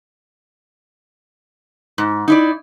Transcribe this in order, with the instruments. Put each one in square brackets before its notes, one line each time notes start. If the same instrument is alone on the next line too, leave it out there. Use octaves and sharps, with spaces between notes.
[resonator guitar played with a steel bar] G#2
D#4 E4 D5